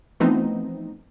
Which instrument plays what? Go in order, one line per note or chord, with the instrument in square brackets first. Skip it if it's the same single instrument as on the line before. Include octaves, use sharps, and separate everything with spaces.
[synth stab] E3 F3 A3 B3 C4 D#4